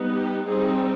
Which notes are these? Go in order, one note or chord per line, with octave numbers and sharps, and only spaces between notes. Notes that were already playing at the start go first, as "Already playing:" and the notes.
Already playing: G3 B3 D#4
G4
G3 C4 D#4 G#4